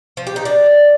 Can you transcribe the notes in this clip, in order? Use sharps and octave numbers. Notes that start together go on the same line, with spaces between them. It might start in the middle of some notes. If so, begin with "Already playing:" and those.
F3
G4
D#4
D4